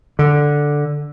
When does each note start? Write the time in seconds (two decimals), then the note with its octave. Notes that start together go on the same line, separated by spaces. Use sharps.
0.19 D3